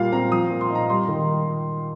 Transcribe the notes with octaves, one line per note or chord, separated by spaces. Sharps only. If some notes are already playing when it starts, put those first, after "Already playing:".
Already playing: A#2 G3 F5
C4 A#5
F3 D#6
A#2
C6
D#4 A#5
G3 C6
D#3